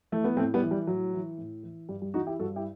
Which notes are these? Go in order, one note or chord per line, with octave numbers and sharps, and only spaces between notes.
E3 A3
B3
A2 A3 C4
G3 B3
E3
G3
A2 F#3
E3
A2
E3
G2 G3
G3
E3 D#4 F#4
E4 G4
G2 F#4 A4
E4 G4